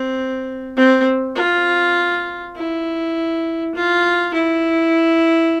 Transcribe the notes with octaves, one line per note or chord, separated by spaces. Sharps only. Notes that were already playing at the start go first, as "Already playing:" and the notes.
Already playing: C4
C4
F4
E4
F4
E4